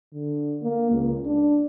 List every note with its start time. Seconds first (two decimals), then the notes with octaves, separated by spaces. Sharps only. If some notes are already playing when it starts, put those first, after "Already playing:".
0.13 D3
0.62 A#3
0.92 C#2
1.26 D4